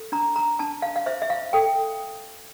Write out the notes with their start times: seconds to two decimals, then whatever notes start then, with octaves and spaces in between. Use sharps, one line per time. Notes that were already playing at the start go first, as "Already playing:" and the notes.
Already playing: A4
0.12 D4 A#5
0.36 A#5
0.59 D4 A5
0.82 F5
0.96 F5
1.06 C5 E5
1.22 E5
1.30 F5
1.53 A4 G5